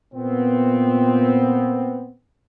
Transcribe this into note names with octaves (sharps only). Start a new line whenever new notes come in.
A#2 B3 C4